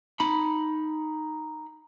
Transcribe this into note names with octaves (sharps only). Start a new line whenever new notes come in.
D#4 B5